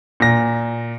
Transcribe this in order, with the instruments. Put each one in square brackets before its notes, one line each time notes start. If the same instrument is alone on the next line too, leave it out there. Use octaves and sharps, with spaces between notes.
[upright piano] A#2 A#6